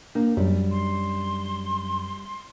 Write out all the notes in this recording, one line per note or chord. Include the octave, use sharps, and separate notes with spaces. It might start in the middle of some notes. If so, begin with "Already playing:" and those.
A#3 D4
F#2 G3
C6